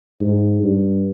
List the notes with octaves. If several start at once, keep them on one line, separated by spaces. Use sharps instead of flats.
G#2
G2